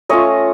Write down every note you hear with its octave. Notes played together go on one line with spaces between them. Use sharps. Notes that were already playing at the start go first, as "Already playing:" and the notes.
A3 C#4 F4 C#5 D#5